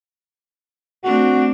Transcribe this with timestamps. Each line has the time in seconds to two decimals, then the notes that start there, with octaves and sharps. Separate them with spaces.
1.04 A3 C4 D4 F#4